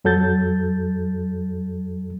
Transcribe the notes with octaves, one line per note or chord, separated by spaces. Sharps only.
F2 F#3 A4 G6 A6